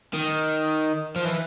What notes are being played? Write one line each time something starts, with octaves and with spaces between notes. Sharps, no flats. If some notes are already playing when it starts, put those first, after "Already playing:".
D#3
F3
E3